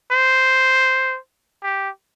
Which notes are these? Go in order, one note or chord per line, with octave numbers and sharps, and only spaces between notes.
C5
G4